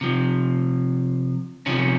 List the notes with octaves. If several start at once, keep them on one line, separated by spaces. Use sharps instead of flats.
C3 F3
C3 F3 C#4